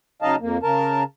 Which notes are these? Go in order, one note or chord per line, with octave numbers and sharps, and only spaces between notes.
C#3 F#3 D#4 D#5 F5 A5
F2 A#3
C#3 A#4 A5